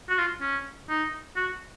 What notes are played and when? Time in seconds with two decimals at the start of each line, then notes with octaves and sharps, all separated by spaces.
0.09 F#4
0.18 F4
0.41 C#4
0.89 D#4
1.36 F#4